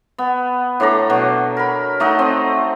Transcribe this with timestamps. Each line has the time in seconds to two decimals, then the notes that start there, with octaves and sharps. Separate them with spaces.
0.18 B3
0.80 A2 D4 A#5
1.10 B2 F#3
1.57 A#4 B5
2.00 A3 D#4 D#5 F#5
2.19 C4